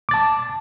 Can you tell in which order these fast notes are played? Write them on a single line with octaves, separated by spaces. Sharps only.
D6 A6 A5